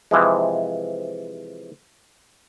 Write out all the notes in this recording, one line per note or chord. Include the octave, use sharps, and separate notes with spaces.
C3 E3 F3 G#3